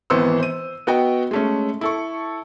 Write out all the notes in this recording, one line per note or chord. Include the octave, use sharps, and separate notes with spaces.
G#1 E3 B3 C5 C6 E6
C5 D#7
B3 F#4 D#5 G5
G#3 A3 C#4
E4 A4 C#6